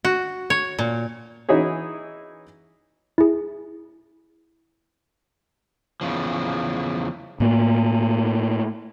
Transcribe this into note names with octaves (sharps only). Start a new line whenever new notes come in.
F#4
C#5
A#2
E3 D#4 E4 F#4 G#4 C#5
E4 G#4
E2 C#3 F3
A2 A#3